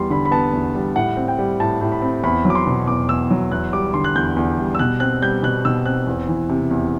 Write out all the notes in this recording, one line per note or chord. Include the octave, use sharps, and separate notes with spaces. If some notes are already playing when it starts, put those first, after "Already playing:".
Already playing: E2 G3 C6
D3 B5
B5
B3 A5
E2
G3
A2 F#5
C4
G5
G3
A2 A5
A2
B5
C4
E2 B5
F#3
D6
C6
B2
E2 D6
E2 E6
F#3
E2 F#6
G3 D6
D3 C6
F#6
E2 G6
E2
G3
E6
B2 F#6
C4 F#6
G3 G6
B2 F#6
B2 E6
C4 F#6
E2
E3
C3
E2